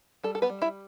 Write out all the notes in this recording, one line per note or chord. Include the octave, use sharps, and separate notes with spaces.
G3 A4
A4
B3 B4
G3
E4 E5